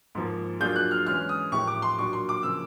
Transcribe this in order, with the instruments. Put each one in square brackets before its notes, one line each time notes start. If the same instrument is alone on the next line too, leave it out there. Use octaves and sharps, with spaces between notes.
[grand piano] G#2 F3 A#3
[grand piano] F#3 A#3 D4 F4 G#4 [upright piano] G6
[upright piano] F#6
F6
[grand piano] E3 G#3 C#4 [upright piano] F6
[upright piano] D#6
[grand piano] A2 F3 A#3 D#4 G4 [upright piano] C#6
[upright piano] D6
C6
[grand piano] A#2 F#3 A#3 D4 F#4 [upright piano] C#6
[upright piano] C6
D6
[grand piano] C#3 F3 A#3 [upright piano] E6